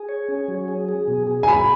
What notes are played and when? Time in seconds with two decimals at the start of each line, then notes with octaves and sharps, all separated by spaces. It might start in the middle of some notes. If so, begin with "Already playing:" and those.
Already playing: G#4
0.09 C#5
0.28 C#4
0.48 F#3
0.68 G#4
0.89 G#4
1.08 B2
1.27 G#4
1.43 G#5
1.47 F#3 B5